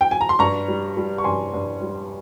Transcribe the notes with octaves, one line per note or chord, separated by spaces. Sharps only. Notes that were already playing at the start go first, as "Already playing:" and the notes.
G5
G#5
A#5
C6
G2 A#5 C#6
G3
G3
C#6
G2 G#5 C6
G2
G3